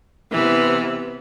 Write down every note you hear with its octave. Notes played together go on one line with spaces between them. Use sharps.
C3 E3 B3